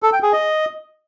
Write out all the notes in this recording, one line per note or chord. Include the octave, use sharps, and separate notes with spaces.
A4
G5
G#4
D#5